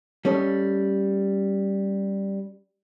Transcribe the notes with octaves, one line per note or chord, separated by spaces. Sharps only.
G3 A3 C#4 A4 D#5